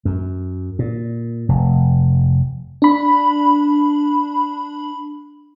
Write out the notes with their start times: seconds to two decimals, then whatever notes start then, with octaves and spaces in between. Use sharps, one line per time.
0.05 F#2
0.79 A#2
1.49 F1
2.82 D4 B5